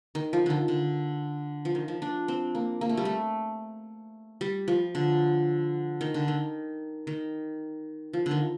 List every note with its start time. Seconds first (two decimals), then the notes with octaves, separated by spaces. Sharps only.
0.15 D#3
0.33 F3
0.46 D3 D#3
0.68 D3
1.65 F3
1.75 D#3
1.88 F3
2.02 D4
2.28 C4
2.55 A#3
2.81 A#3
2.89 A3
2.97 G3
3.05 A3
4.41 G3
4.68 F3
4.95 D3
6.01 D#3
6.14 D3
6.28 D#3
7.07 D#3
8.13 F3
8.26 D3
8.31 D#3